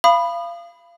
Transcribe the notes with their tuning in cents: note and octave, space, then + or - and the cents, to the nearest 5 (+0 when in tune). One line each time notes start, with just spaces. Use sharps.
F5 -25 B5 +0 D#6 -30